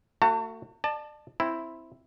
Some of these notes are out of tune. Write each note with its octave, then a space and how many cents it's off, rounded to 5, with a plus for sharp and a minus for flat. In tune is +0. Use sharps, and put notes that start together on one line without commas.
A3 +40 F#4 +0 A5 +40
D5 +40 A5 +0
C4 +0 E4 +0